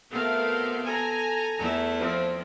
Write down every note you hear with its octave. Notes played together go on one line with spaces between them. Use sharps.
B2 A3 B3 C4 A#4 F5
A4 G#5 A#5
E2 A3 E4
F3 C4